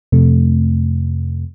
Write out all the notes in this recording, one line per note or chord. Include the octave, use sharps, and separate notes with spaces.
F2 C3 A3